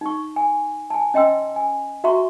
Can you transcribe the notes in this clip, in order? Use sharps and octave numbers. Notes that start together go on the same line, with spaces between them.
D#4 C#6
G#5
G#5 A5
C#4 D#5 G5 C6 E6
G#5
F#4 E5 A#5 C6 C#6